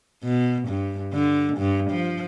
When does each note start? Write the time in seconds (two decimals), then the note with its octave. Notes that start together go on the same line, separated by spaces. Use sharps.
0.24 B2
0.68 G2
1.13 D3
1.58 G2
1.91 F3